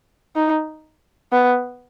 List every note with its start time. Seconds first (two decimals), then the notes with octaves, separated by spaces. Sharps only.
0.36 D#4
1.32 B3